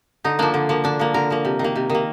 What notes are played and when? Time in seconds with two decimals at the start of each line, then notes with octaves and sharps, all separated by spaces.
0.24 D3 D#4
0.39 F3 A#3 D4
0.54 D3
0.69 F3 A#3
0.84 D3 D4
0.99 F3 A#3
1.14 D3 A#4
1.30 F3 A#3
1.45 C3
1.59 D#3
1.64 A#3
1.76 C3
1.90 D#3 A#3